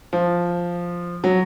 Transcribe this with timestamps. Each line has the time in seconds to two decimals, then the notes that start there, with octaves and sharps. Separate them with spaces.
0.13 F3
1.24 F#3